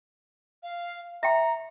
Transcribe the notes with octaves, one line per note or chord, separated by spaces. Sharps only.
F5
E5 G5 A#5